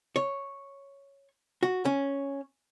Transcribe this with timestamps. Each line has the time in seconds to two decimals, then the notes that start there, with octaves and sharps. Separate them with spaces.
0.16 C#5
1.63 F#4
1.85 C#4